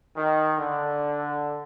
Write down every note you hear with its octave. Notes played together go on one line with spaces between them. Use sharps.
D#3
D3